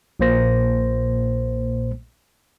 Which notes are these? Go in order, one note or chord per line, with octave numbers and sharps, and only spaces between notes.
A#1 A#2 A#3 C5 A#6